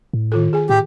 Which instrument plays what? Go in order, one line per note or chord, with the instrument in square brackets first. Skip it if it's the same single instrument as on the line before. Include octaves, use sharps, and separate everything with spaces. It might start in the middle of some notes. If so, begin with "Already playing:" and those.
[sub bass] A2
[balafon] D#3 F4 A4
G#4 G#5
[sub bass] A2 [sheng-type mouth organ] G4